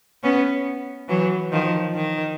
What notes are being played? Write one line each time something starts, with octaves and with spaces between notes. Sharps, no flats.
B3 C#4
E3 F#3
D#3 F3
D#3